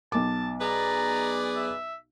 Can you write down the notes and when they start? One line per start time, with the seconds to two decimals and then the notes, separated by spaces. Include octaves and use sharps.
0.12 B1 A5 D6
0.61 G#4 B4 D5 A#5
1.55 E5